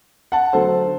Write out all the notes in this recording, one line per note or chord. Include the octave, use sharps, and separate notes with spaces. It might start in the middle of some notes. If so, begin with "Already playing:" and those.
F#5 A5
D3 F#3 A3 A4 C5